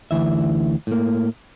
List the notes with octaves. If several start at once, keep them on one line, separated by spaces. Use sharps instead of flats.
D2 E3 E5
A2 A#3